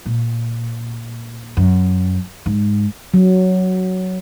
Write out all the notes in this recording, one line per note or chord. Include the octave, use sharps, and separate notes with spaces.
A#2
F#2
G#2
F#3